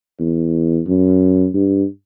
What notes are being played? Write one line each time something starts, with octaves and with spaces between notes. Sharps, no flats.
E2
F#2
G2